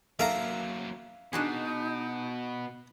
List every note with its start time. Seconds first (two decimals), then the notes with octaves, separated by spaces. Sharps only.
0.19 F#3 A#3 D#4 A4 A#4 E5 F5 A#5
1.33 B2 D4 D#4 F#4 G#4